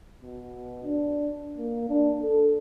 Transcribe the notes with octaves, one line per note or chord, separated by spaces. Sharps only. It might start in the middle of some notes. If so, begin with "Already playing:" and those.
B2
D4
A#3
D4
A4